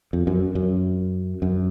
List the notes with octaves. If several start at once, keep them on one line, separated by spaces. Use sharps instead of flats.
F2
F#2
F#2
F#2